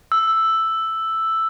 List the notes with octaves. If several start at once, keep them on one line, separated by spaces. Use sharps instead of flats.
E6